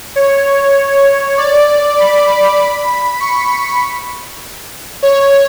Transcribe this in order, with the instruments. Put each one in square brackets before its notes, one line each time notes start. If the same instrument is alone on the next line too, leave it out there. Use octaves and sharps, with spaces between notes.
[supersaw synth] C#5
D5
B5
C#6
C#6
C#5